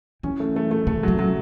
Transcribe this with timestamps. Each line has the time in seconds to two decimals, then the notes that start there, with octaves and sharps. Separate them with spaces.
0.23 E3 C#4
0.40 A3
0.56 A3
0.71 A3
0.87 C#3 A3
1.03 C#3 F#3
1.19 F#3